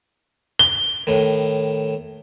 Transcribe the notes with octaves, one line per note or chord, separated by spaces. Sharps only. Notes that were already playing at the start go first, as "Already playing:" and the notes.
G7
A2 D#3